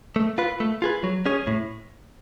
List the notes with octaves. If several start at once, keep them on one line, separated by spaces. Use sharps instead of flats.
A3
F4 B4
A3
F4 G#4 B4
F#3
C#4 G#4 C#5
A2